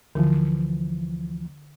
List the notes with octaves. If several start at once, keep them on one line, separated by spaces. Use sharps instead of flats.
D2 D3 E3 F3